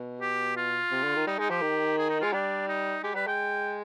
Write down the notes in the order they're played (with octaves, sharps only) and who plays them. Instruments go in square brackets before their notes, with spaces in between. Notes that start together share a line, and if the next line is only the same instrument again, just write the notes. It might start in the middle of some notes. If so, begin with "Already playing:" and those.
Already playing: [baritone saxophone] B2
[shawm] G4
F4
[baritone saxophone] C3
D3
D#3
[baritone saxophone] G3 [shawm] D#4
[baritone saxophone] G#3 [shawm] D#4
[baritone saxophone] F3 [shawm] G4
[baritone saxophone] D#3
[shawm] G#4
D#4
[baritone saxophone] G#3 [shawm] F4
[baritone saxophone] G3 [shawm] D4
[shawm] D#4
[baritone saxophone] G#3 [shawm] G4
[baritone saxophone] G3 [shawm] B4
[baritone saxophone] G#3 [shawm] G5